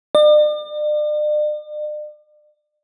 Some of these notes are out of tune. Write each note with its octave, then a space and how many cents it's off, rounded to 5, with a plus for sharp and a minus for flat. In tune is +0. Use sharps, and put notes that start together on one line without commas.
D5 +40